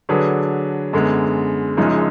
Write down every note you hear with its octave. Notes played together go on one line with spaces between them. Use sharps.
D3 F#3 D4 G#4 B4
F#2 D3 G#3 B3
F#1 F#2 F3 G#3 D#4